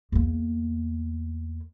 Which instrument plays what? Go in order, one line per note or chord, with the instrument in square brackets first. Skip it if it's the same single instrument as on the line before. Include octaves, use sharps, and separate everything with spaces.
[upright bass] E2 A#3